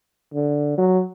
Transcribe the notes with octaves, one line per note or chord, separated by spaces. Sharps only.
D3
F#3